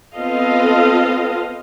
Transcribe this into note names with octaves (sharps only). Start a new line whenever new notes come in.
B3 C4 F4 A4 D#5 F5